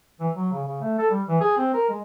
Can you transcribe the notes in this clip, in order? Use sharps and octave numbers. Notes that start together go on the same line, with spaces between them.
E3
F#3
C#3
C#3
A3
A4
G3
E3
G#4
C4
A#4
G#3